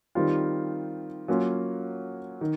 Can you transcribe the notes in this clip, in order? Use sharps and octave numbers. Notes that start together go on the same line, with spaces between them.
D#3 G3 C4 F4
F#3 A#3 C#4 F4
D#3